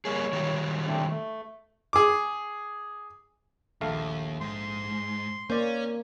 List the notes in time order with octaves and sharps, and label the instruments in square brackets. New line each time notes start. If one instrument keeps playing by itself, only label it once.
[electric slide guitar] G3 A#3 G#4 [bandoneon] C#5
[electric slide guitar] D#3 F#3 G3
[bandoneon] A3 C4 D4
A3
[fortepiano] G#4 D6
[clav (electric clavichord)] A#1 A3 F5 [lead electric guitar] D#2
[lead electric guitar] G#2 [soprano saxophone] C6
[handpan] A#3 [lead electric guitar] C#4 [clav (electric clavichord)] C5 D5